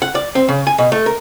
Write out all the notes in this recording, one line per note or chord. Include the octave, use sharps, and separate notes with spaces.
F#5
D5
C4
C#3
G#5
B2
A3
A#4